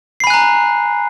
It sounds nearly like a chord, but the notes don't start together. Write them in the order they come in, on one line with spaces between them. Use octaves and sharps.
C7 B5 G#5 F#6 A#5